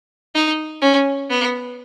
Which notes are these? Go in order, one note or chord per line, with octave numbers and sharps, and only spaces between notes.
D#4
C#4
B3